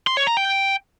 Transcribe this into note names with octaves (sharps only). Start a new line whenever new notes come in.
C6
C#5
A#5
G5